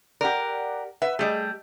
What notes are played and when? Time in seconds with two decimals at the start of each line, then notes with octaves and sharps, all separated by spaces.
0.21 G4 A#4 D5 F#5
1.02 B4 E5 F#5
1.19 G3 A3 G#4 D#5